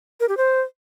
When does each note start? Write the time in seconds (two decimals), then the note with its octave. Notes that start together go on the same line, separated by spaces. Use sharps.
0.20 A#4
0.29 G4
0.37 C5